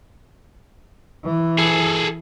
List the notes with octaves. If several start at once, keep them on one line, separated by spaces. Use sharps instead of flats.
E3
G#4 A4